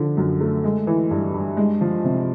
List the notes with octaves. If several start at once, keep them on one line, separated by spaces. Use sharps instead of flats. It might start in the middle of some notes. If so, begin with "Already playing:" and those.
Already playing: D3 F3
F#2
A3
G#3
E3
G2
G2
G#3
F3
C3